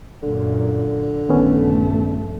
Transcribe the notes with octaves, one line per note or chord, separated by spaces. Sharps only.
F#2 A#2 D3
A#1 G2 D#3 A3 B3 C#4